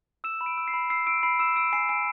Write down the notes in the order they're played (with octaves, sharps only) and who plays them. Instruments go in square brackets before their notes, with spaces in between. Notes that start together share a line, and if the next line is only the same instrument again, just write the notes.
[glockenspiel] E6 E7
B5
D7
E6
C7
B5
E6 C7
E6 D7
B5 C7
E6 E7
E6 D7
G#5 C7
G#5 D7